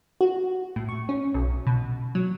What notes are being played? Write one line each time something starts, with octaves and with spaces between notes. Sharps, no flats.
F#4
A2
C#6
C#4
B1
B2
F#3